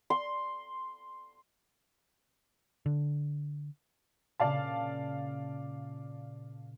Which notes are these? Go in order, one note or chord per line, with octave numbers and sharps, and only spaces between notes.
C6
D3
A#2 C#3 D5 F5 A5